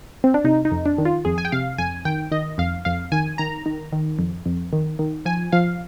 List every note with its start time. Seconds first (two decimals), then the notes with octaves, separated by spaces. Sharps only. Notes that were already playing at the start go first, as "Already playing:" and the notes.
0.24 C4
0.34 D4
0.44 C3 D#4
0.65 D#4
0.71 F2
0.86 D4
0.98 D#3
1.05 F4
1.25 F2 G#4
1.38 G#5
1.45 G5
1.52 C3 F5
1.78 F2 G#5
2.05 D#3 G5
2.32 D#3 D#5
2.58 F2 F5
2.85 F2 F5
3.12 D#3 G#5
3.38 D#3 A#5
3.66 D#3
3.93 D#3
4.19 F2
4.46 F2
4.73 D#3
4.99 D#3
5.26 F3 G#5
5.52 F3 F5